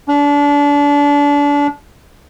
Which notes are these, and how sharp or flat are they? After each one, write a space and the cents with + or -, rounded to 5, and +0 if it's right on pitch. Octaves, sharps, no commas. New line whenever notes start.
D4 -30